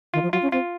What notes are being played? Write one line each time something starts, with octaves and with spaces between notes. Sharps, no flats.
D#3 F4
F3
F#3 F4
C#4
C4 F4